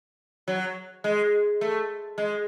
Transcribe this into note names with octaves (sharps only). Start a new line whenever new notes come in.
F#3
G#3
A3
G#3